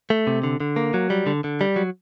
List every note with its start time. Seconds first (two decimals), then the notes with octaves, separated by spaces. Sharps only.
0.10 A3
0.27 C3
0.44 D3
0.60 D3
0.76 A#3
0.94 F#3
1.10 G3
1.27 D3
1.44 D3
1.61 G3
1.76 F#3